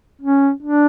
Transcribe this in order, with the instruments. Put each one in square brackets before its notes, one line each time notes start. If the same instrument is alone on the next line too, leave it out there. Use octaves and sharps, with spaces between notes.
[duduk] C#4
D4